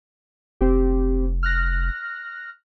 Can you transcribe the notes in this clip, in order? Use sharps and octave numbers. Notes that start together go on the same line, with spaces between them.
F1 C4 G4
F6 F#6 A#6